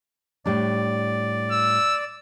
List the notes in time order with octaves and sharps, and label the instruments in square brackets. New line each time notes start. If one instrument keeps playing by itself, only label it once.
[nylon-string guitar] A2 G3 D4 [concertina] D5
[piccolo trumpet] E6